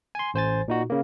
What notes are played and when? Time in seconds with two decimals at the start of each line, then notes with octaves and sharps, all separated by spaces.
0.15 G#5 C6
0.34 A1 C5 G#5 A6
0.68 A#2 D#4 F#4
0.90 C#3 A#3